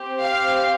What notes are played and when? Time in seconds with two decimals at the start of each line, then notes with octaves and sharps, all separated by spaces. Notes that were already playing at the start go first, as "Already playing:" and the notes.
Already playing: C4 G4
0.21 F5